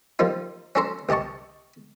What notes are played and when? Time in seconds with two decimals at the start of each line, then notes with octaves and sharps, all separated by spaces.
0.19 F3 G3 A#3 D#4 F4
0.75 C#4 D4 F#4 A4 A#5 C6
1.09 C2 G4 D#5 A5 C#6